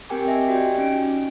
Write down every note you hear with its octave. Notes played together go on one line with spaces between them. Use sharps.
C4 G4 A#4 G5 G#5 D6
D#5 E5 G#5
F#4 G4 D5 D#5 G5 G#5
C#4 D#4 D7